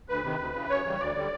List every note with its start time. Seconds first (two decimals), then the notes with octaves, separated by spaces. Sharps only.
0.09 D2 B4
0.24 C3 D#3
0.39 D2
0.54 C#3 E3
0.69 F#2 C#5
0.84 C#3 E3 G3
1.00 D2 D5
1.15 D3 G3